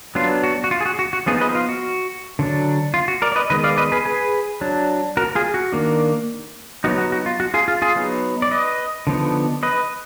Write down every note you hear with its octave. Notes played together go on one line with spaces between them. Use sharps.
F#3 B3 D4 F4
F#4
F#4
F4
G#4
F#4
F#4
F#4
F3 B3 D#4 F4 G#4
B4 D#5
F4
F#4
D3 F#3 D4
F4
F#4
A#4 D5
D5
B4 D#5
D#3 G#3 B3 B4 D#5
D5 F5
B4 D#5
G#4 B4
G#4 B4
F#3 D4
F#4 A#4
F4 G#4
F#4
D#3 A#3 D4
F#3 B3 D#4 F#4
F#4
F#4
F4
F#4
F4 G#4
F4
F4 G#4
F#3 B3 D#4
D5
B4 D#5
D3 F3 B3 D#4
B4 D#5